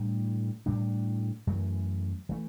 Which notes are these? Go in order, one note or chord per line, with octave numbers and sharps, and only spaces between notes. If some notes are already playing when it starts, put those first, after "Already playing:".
Already playing: A2 G3 D4
A2 G3 D4
F#2 E3 A3
E3 A3